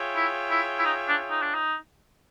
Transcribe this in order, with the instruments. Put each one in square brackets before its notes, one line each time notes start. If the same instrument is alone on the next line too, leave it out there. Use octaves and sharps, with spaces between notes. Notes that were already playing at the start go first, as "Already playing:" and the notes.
Already playing: [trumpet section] F4 G#4 C#5 E5 G5
[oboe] E4
E4
E4
D#4
D4
D#4
D4
D#4